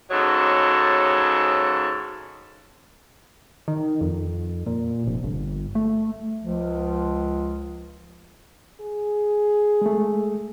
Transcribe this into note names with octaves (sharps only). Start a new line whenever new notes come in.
G#2 C#3 F#3 A4 C#5 D#5
D#3
F2
A#2
F1
G1
A3
C#2 F3
G#4
G#3 A3